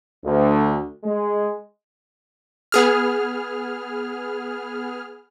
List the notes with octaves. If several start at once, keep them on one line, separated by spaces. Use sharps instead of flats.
D2
G#3
B3 G#4 F6